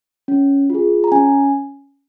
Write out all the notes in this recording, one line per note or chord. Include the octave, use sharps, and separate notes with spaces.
C#4
F4 G#4
A#5
C#4 G#5